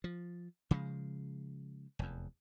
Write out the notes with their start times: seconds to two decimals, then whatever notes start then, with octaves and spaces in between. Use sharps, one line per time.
0.04 F3
0.71 C#3 F3 G#3
1.99 F1 E2